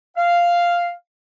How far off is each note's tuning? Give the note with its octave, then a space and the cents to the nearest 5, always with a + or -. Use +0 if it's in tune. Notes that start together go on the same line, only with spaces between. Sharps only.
F5 -5